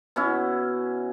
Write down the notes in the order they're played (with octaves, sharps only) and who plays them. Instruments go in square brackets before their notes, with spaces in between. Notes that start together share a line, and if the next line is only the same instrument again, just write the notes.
[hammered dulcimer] B2 C#4 E4